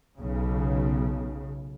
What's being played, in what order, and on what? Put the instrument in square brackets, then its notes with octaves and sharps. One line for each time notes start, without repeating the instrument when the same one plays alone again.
[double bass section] B1 C#3